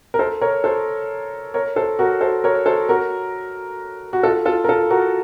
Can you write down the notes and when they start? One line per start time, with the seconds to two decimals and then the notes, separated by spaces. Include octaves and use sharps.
0.14 A#4
0.19 A4 C5
0.41 A#4 C#5
0.64 A4 C5
1.54 A#4 C#5
1.76 A4 C5
1.99 F#4 A#4
2.21 A4 C5
2.44 A#4 C#5
2.66 A4 C5
2.89 F#4 A#4
4.13 F#4
4.23 F4 A4
4.45 F4 A4
4.64 A#4
4.69 F4 A4
4.90 F#4 A#4